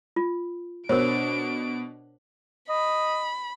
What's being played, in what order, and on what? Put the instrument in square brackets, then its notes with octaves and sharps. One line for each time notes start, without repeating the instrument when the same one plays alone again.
[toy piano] F4
[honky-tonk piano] B2 [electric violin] D4 D7 [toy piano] A#4 C5 C#5
[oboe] D#5 [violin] B5